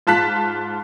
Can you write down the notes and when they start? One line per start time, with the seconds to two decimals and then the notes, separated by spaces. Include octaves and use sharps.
0.07 G#2 F4 A5 F#6 B6